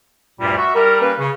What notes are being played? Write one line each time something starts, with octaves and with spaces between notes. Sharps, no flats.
D2 G2 A#2 G3
F#4 E5
G3 A#4
A#3 C#4 B4
C#3